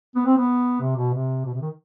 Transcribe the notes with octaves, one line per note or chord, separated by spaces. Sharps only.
B3
C4
B3
C3
B2
C3
B2
C3
D#3